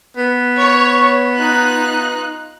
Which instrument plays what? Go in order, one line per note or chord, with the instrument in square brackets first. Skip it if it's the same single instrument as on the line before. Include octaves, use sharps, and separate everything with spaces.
[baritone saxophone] B3
[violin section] C#5
D#4 F4 F#6